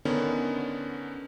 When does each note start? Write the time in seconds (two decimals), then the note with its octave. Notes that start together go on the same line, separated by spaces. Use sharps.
0.05 D3 D#3 B3 C#4